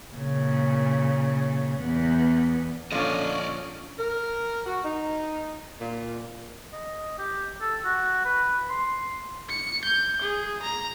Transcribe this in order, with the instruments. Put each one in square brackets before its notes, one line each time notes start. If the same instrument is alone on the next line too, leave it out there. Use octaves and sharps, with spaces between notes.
[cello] A#2 C#3
E2 B3
[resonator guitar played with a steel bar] A#2 F3 F4 [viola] D3 C#4 [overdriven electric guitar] D5 D#5
[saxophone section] A#4
F#4
D#4
A#2
[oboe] D#5
G4
A4
F#4
B4
C6
[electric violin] C#7
G6
G#4
A#5